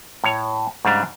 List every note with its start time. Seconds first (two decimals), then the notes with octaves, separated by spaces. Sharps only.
0.24 A2 C#5
0.85 G#2 C#3 G3 D4